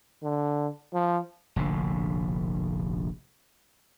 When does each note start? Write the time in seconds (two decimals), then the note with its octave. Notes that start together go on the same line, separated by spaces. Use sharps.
0.23 D3
0.93 F3
1.56 F1 A#1 A2 D3